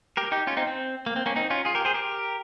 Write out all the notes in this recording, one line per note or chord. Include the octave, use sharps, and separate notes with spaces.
G4 A#4
D#4 G4
C#4 F4
C4 D#4
C4
A#3
C4
A#3 C#4
C4 D#4
C#4 F4
F4 G#4
G4 A#4
G#4 C5
G4 A#4